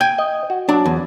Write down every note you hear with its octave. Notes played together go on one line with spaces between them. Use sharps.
G5 G#5
D#5
F#4
F#3 D4 A5
E2